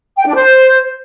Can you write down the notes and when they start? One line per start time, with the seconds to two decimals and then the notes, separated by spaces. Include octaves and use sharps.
0.17 G5
0.26 D4
0.34 C5